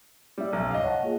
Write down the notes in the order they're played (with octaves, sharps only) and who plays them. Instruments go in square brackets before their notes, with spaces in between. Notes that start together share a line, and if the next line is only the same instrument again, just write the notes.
[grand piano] G3 [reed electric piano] C#4 E5
[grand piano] B1
[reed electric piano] C#2 G2 [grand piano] D#5 F5
[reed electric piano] C#5 F#5 A5
A#3 F4 G#4